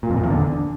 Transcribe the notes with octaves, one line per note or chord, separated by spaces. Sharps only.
A#2
F2
A#2
E2
D3